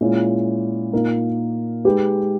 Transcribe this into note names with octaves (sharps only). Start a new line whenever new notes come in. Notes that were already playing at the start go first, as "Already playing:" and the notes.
A#2 G#3 C#4 E4
A#2 A#3 D#4 A#4
G#3 D#4 G4 B4